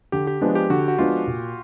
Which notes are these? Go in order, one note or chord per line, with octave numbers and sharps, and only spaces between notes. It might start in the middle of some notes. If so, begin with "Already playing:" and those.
D3 G4
G4
F3 G#3 B3 D4
G4
D3 F#4
F#4
F3 G#3 B3 D4 F4
A#2